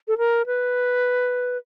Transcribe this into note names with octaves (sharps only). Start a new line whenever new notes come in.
A4
A#4
B4